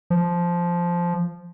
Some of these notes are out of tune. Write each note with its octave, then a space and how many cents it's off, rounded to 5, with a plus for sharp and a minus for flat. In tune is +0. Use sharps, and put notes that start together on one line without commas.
F3 -5